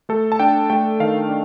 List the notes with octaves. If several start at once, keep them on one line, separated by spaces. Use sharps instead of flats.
A3 A4
A5
D4 G5
A3 G5
D#3 F5
D4